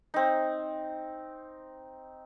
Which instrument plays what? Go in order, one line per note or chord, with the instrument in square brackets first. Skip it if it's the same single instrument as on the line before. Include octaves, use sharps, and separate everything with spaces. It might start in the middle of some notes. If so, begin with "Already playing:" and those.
[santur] C4 D#4